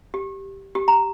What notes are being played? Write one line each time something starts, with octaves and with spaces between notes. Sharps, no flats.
G4
G4
A#5